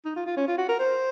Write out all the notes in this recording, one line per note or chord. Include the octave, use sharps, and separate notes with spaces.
D#4
F4
F4
C#4
F4
F#4
A#4
C5